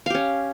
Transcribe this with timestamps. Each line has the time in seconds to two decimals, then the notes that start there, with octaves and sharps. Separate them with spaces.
0.06 F5
0.10 G4
0.14 C#4